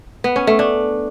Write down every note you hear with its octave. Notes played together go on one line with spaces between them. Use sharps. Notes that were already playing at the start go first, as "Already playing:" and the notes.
B3
C#4
A3
D4